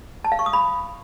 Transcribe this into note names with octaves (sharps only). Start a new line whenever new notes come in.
A5
F5
C#6
D#6
B5